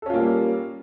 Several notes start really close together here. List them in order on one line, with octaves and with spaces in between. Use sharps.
A4 C#4 F4 A#3 G3